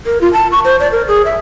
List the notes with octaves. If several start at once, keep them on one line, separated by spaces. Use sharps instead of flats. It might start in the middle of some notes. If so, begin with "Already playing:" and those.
A#4
F4
A5
C#6
C5
D5
A#4
G#4
E5